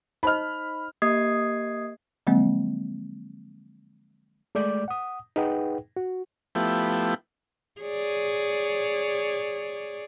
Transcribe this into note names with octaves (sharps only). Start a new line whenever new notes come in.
D#4 C5 D#5 B5 F6
A#3 G4 D#5 D#6 G#6 C7
D3 F3 F#3 G#3 A#3 C4
G#3 A3 D5 D6 G6
F#5 D#6
D#4 G#4 B4 F#5 G5
F#4
F3 A3 B3 E4 G4
G#4 C#5 D5